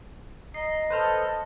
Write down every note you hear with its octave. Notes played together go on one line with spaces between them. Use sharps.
D#5 A#5 C7
A4 B4 C5 F6